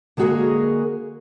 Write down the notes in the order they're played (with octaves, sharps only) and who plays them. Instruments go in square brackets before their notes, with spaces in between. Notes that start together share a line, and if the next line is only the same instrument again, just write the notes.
[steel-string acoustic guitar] D3 G#3 A#3 F#4 G#4 A#4